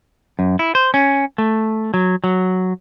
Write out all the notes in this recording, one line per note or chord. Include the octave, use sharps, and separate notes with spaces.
F#2
E4
C5
C#4
A3
F#3
F#3